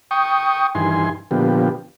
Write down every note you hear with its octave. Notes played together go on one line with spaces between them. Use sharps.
G5 C#6 D#6
G2 D#3 E3 G#5 C6
A#2 D3 F3 B3 G4